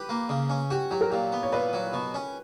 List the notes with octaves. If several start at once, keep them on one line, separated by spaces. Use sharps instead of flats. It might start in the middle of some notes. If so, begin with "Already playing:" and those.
Already playing: G4 B4
A#3
C#3
C#4
F#4 G4
F#3 G4
A#4
A#2 G4
B3
C#5
A#2 B4
F#3
B2
C#4